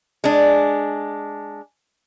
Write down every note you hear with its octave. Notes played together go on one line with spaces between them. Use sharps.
G#3 D4